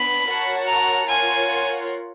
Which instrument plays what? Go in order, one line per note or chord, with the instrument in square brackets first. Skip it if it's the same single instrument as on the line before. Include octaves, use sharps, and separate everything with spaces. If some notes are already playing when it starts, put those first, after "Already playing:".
Already playing: [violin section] B3 D4 [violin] B5
[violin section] F#4 A#4 C#5 F#5 A5
[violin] A#5
[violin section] F4 A#4 C#5 F#5 [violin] G#5